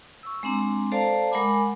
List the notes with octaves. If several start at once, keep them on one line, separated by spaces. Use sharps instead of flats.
C#6 E6
G#3 C4 D4 A#5
A4 C5 D5 F5 A5 A#5
G#3 A#4 F#5 G#5 B5 D6